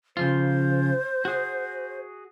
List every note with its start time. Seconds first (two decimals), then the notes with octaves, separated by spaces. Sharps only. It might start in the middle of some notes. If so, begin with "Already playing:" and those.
0.17 C#3 F3 F4 C5
1.25 F#4 G#4